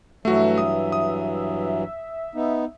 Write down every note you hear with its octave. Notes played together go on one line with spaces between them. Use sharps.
G2 E3 F#3 A3 F#4 E5
D#6
D#6
B3 D#4